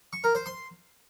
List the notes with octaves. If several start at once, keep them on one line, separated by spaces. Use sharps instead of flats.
C#6
A#4
C5
C6